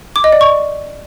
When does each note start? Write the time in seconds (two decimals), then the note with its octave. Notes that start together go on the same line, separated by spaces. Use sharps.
0.16 D6
0.24 D#5
0.32 D5
0.41 C#6